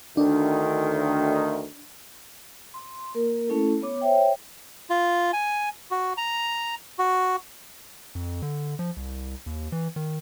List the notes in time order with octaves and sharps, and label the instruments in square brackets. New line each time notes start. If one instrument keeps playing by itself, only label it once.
[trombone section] D2 D#3 [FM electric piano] D4
[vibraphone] C6
A#3 A#4
A3 C#4 E4 A4
B3 C#5 D6
C5 C#5 E5 G5
[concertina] F4
G#5
F#4
A#5
F#4
[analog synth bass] F2
D3
F3
C2
D#2
E3
D#3